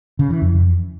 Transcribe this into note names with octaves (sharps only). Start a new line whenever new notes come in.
C#3
E3
F2